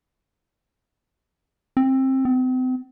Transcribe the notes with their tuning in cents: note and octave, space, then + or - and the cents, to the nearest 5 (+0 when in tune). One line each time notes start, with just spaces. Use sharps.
C4 +20
C4 -40